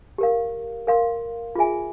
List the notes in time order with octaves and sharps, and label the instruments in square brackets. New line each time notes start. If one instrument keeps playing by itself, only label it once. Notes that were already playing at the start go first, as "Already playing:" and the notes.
[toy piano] G4 A#4 F5
A#4 F5 C6
F4 G#4 E5 G#5